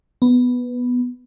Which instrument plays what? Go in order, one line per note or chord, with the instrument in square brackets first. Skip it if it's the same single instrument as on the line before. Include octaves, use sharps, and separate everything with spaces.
[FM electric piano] B3